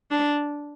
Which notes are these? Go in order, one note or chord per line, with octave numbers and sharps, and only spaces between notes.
D4